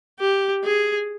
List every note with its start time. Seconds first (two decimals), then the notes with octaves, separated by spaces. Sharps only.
0.20 G4
0.64 G#4